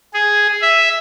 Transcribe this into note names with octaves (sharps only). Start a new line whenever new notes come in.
G#4
E5